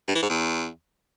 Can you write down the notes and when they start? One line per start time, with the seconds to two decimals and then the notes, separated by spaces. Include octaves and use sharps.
0.08 G2
0.15 E3
0.22 G#2
0.29 E2